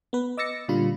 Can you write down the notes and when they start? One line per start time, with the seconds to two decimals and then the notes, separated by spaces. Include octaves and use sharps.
0.13 B3 B4
0.37 D#5 D6 E6 A6 A#6 C#7
0.68 A#2 D3 G3 F4 B5